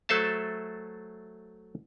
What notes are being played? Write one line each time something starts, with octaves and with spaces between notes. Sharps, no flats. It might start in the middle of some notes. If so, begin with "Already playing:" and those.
F#3 A3 A4 C5 E5 A5